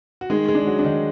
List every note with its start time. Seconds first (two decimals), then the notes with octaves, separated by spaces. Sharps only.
0.21 F#4
0.30 D#3 G#3 G#4
0.48 G#3 G#4
0.54 D4
0.67 F#3 F#4
0.79 D4
0.84 D#3 D#4